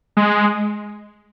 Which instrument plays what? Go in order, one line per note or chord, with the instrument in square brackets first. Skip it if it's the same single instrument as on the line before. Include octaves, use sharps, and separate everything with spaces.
[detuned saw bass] G#3